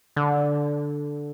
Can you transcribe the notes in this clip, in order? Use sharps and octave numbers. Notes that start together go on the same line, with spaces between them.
D3